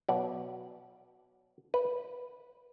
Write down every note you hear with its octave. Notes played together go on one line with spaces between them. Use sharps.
B2 F#3 D5
B4